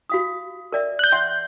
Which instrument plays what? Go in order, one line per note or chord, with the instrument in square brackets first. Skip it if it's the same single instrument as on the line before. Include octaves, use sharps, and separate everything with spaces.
[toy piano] F#4 F5 D#6
A#4 D5 E5
[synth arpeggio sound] F#6 G6
[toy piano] E5 F#5 C6